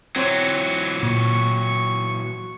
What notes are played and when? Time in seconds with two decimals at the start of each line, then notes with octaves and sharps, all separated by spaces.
0.16 E3 F#3 C4 C5 C#5
1.03 A#2 C#6